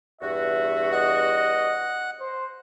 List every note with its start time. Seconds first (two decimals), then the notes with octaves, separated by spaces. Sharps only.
0.21 E2 G2 F#4 E5
0.92 D#5 F#5
2.20 C5